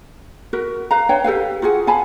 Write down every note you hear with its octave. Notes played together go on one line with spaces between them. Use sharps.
F#4 A#4 B4
B4 F5 A#5
D4 B4 C#5 G5
G4 A4 B4 F5
F4 F#4 G#4 F#5
F5 G#5 A5 B5